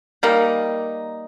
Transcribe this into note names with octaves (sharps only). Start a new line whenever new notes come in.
G3 A#3 D#4